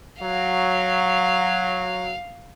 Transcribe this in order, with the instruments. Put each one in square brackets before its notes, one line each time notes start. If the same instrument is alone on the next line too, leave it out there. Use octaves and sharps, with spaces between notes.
[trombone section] F#3 [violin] F5